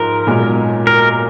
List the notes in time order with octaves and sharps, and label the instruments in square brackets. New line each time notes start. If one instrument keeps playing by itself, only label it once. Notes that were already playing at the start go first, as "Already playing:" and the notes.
Already playing: [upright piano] G#2 F3 [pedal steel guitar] A#4
[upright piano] B1 A#2 G#3
[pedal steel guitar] A#4